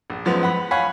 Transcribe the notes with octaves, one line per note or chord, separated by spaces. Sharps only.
A#1
F#2 F3 G#3 B3
F#5 B5
C#5 F5 F#5 G#5 B5